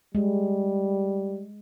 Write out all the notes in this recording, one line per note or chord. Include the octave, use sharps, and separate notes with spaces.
G3 G#3